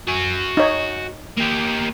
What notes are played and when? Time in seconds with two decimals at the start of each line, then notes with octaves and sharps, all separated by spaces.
0.08 F#4 G#5
0.57 D#4 C#5
1.38 A#3 G4